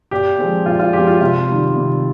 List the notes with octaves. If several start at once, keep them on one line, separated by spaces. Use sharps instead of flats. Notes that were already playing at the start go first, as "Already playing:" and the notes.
A#2 G4
F3 G#3 C4
A#2 F4
F4
F3 G#3 C4 G4
F4
C3 F4
D#3 G3
C3